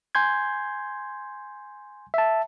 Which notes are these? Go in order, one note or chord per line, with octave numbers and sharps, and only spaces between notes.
G#5 C6 G6 G#6
E5 A5